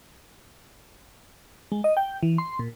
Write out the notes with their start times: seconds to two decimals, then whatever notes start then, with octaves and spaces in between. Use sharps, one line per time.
1.72 G#3
1.84 D#5
1.97 G5
2.23 E3
2.38 C6
2.59 A#2